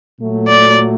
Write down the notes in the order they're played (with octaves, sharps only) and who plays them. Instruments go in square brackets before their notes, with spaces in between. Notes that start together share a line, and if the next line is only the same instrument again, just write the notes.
[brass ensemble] A#2 F#3 A3
[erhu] D5